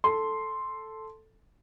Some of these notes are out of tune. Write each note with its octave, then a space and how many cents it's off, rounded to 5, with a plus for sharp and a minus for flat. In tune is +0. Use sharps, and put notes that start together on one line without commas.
A4 +0 C6 +0